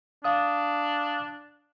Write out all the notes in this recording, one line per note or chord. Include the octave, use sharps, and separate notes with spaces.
D4 F5 D#6